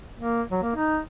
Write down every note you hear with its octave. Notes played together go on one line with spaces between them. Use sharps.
A#3
F#3
A#3
D#4